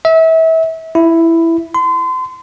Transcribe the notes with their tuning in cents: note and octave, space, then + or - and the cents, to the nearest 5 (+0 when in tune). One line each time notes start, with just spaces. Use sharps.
E5 -30
E4 +5
C6 -35